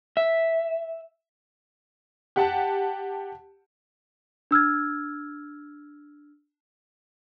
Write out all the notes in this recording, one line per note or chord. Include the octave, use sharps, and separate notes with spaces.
E5
G4 F#5 A5
D4 E6 F6 G#6